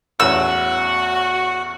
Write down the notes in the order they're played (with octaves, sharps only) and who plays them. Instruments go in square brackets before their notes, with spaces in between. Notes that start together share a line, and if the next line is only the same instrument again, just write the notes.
[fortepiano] A1 E2 C#4 [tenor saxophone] F#4 [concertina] F#5 [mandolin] E6